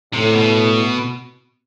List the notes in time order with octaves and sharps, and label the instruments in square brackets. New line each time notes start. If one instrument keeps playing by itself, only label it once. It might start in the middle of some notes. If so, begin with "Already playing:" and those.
[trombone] A2 [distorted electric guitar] C3
[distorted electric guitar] B2